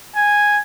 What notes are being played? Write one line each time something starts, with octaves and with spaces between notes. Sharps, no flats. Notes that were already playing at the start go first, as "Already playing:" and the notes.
G#5